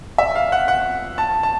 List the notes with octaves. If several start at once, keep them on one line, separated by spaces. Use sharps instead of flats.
E5
F5
F#5
F#5
A5
A5